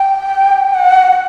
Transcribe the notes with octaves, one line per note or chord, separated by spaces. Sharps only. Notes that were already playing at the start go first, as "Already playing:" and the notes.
Already playing: G5
F#5